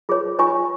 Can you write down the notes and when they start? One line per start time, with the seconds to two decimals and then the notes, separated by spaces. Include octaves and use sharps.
0.09 F4 G#4 C#5
0.39 F4 C#5 G#5 C#6